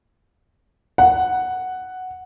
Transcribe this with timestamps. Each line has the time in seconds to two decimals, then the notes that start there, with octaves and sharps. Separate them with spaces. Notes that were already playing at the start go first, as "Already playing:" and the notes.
0.98 F#5